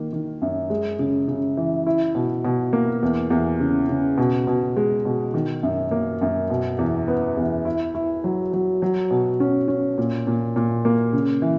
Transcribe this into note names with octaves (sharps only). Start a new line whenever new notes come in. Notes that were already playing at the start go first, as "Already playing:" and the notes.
Already playing: D#3 A#3
D#3
F#2
G#3
C#3
C#3
E3
E4
B2
B2
A#3
E2
E2
C#3
C#3
B2
B2
G#3
B2
D#3
F#2
A#3
F#2
B2
E2
B3
E2
E4
E4
F#3
F#3
F#3
B2
C#4
C#4
A#2
A#2
A#2
A#3
C#3
E3